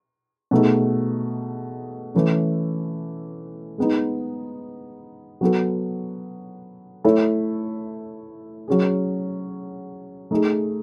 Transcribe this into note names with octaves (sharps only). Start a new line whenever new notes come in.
B2 A3 D#4 G#4
E3 A3 C#4
G#3 B3 D#4
F#3 B3 F#4 A4
A3 E4 A4 C#5
F#3 C#4 G#4
A3 D#4 G#4